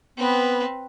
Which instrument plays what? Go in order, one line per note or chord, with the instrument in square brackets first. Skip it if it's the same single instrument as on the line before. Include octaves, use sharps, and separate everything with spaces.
[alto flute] B3 [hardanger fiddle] C4 B4